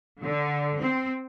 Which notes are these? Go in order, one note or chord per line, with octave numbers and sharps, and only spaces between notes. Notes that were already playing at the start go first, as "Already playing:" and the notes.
D3
C4